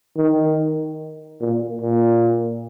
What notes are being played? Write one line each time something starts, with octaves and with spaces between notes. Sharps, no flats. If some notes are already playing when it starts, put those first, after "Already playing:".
D#3
A#2
A#2